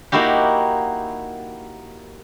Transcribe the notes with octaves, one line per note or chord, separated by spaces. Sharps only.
A#3 D#4 E4 F#4 G4